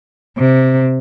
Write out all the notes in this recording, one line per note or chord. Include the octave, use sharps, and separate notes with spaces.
C3